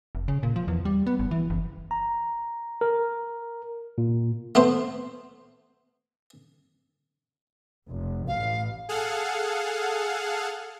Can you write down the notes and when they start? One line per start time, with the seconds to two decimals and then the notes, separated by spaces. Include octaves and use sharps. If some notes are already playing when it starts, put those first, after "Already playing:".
0.15 F1
0.28 C#3
0.43 A#2
0.56 F3
0.68 E2
0.85 G3
1.07 B3
1.19 G#1
1.31 E3
1.50 F#1
1.91 A#5
2.81 A#4
3.98 A#2
4.55 A3 B3 C5
7.88 F1
8.28 A1 F5
8.89 G#4 A4 F5 F#5